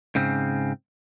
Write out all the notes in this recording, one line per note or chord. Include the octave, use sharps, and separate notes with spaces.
G#2 C#3 C4